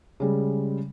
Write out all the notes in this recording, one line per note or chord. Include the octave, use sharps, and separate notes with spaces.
C#3 G3 G#3